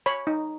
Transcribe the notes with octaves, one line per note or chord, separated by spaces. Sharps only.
C#5 B5
D#4